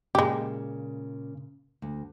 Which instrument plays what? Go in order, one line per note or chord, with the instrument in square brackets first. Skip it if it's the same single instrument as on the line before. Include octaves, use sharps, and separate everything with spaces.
[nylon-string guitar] A#2 C#3 [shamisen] G#3 G4
[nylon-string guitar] D2